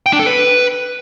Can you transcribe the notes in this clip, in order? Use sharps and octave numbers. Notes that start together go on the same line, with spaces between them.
G5
D4
A4
B4